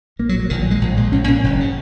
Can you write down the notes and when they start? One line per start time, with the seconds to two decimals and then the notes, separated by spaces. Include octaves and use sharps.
0.19 A#1 A#3
0.29 F#3
0.34 A#2
0.40 F#3
0.50 A#1 D#3
0.61 F#3
0.66 A#2 G#3
0.81 A#1
0.96 A#2 G#3
1.12 A#1 C#4
1.28 A#2 C#4
1.44 F#1
1.60 C#3